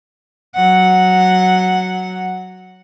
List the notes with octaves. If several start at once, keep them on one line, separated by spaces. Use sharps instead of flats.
F#3 F#5